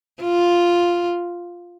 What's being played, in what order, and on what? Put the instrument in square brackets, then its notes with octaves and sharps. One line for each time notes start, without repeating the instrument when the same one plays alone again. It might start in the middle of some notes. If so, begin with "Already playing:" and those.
[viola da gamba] F4